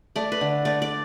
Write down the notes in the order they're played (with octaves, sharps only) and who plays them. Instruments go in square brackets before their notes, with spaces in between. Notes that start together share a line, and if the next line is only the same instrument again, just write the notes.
[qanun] A3 D5
B4
D3
A3 D5
D5